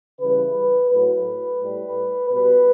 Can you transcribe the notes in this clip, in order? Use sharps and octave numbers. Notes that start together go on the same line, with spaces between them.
C#3 E3 G3 B4
A2 F#3 B4
A2 G3
B2 G3 B4